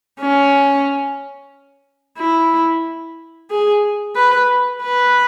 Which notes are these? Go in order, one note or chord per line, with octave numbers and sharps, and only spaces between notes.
C#4
E4
G#4
B4
B4